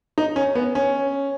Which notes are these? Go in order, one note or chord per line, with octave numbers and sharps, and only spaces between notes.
D#4
C#4
B3
C#4